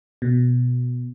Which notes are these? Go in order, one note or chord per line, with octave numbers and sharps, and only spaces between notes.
B2